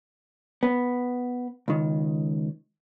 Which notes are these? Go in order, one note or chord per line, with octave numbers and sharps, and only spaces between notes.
B3
C#2 D#3